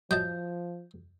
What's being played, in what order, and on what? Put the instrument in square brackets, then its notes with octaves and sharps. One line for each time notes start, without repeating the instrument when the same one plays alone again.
[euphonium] F3 [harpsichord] F#3 D#5 A5 [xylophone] G6